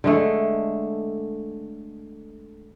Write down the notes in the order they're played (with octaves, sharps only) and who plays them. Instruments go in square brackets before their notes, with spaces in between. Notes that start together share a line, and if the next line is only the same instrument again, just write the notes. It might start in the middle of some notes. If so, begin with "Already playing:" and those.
[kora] D3 G#3 A3